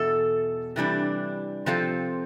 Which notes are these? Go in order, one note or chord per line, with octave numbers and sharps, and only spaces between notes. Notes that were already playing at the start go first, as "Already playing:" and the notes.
Already playing: E2 B2 A4
C3 E3 G3 D4
C3 F3 C4 F4 A4